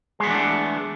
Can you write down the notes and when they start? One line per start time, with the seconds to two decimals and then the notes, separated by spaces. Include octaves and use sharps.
0.20 G#3
0.23 B3
0.27 E3
0.30 D4
0.34 A3